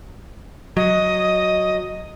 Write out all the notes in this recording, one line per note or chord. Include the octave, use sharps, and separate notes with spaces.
F#3 D#5